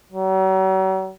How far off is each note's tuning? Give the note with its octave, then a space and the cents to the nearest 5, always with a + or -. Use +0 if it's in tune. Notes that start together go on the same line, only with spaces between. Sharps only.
F#3 +45